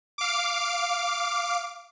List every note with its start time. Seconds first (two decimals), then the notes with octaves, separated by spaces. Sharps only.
0.18 F5 D6